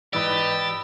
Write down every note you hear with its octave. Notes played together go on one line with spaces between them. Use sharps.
G#2 E3 D#4 G4 B4 D5 E6 A6